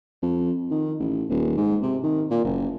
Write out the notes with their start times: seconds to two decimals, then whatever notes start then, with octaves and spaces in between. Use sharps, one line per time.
0.22 F2
0.71 D#3
0.99 A1
1.29 D#1
1.57 G#2
1.82 C3
2.03 D#3
2.31 A#2
2.45 F#1